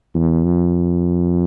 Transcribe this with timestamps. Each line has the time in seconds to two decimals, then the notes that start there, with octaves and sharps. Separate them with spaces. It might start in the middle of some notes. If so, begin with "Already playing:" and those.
0.15 E2
0.45 F2